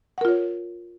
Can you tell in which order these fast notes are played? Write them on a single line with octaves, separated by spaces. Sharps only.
F#5 A#4 F4 C#5